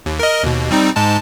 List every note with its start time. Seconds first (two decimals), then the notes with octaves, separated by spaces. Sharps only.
0.06 D#2
0.19 A#4 D#5
0.43 D#2 B2
0.71 G3 C4 D#4
0.96 G#2 G#3 A5